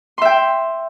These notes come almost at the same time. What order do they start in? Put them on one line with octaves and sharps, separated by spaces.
C6 E5 G5